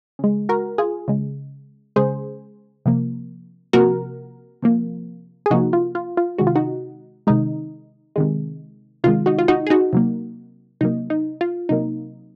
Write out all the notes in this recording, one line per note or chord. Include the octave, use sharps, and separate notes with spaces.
C#3 G#3
F#4 A#4
F4 G#4
C#3 G#3
C#3 G#3 G#4 C5
C3 F3 A#3
C3 F3 A#3 F#4 A#4
C3 F3 A#3
G#4
C3 F3 A#3 D#4 F#4
F4
F4
F4
C3 D#3 G#3 F#4
F4
D#4 F#4
C3 D#3 G#3 D#4
C3 D#3 G#3
C3 D#3 G#3 F4
D#4 F#4
F4
D#4 F#4
G#4
D#4 F#4
C3 F#3 A#3
C3 F#3 A#3 D#4
D#4
F4
C3 F#3 A#3 D#4